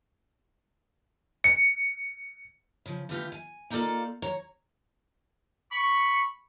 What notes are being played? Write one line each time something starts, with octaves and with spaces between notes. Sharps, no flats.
C#7
C#3 F3
D3 E3 A3 F4 G4
G#5
A#3 D#4 F4 A4 D5 F5
C#5 A#5
B5 C#6